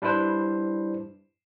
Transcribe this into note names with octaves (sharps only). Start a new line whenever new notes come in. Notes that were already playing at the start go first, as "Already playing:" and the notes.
G3 D4 E4 B4 C5